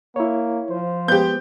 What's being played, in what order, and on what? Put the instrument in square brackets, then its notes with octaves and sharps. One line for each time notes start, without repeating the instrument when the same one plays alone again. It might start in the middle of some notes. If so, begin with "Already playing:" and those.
[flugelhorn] A#3 [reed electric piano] E4 C#5
[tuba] F3 [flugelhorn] C5
[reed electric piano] G#3 B3 [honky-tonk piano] G4 G6